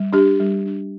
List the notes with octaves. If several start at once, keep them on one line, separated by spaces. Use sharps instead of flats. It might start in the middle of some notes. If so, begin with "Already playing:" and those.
Already playing: G3
D4 G4
G3
D4